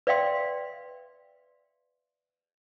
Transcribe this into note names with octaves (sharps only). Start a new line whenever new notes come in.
B4 D5 E5 F5 G5 C6